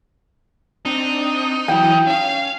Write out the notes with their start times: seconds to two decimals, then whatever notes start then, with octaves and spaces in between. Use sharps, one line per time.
0.85 C4 D4 D#4
1.68 E3 F#3 E4 G5
2.07 C#4 F5